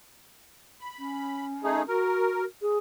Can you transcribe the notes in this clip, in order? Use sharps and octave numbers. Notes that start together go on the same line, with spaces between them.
B5
C#4
A3 D#4 G#4
F#4 A#4
G#4